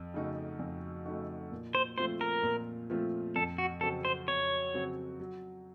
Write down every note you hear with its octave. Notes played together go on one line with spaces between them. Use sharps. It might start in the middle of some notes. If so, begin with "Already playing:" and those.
Already playing: F2
C#3 A3 D#4 F#4
F2
C#3 A3 D#4 F#4
A#2
C5
F3 A3 C4 F4 C5
A#4
A#2
F3 A3 C4 F4
F2 A4
F#4
C#3 F#3 C4 F#4 A4
C5
F2 C#5
C#3 F#3 C4 F#4
F#3